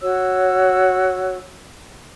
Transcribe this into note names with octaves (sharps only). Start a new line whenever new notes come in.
F#4 C#5 E6